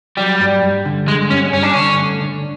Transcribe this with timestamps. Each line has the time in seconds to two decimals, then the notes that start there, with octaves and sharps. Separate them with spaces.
0.17 F#3 G3
0.40 G2
0.63 G2
0.85 D3
1.07 D3 G#3
1.30 G2 C#4
1.53 G2 C#4
1.63 D4
1.74 D3 C#4
1.98 A3
2.21 D3